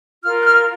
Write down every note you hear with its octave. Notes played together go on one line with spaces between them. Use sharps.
F4 A#4 F6
F#6
F6